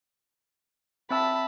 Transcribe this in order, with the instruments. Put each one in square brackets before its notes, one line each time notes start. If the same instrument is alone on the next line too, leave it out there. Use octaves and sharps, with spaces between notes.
[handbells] C4 E5 E6 [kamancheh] A5 B5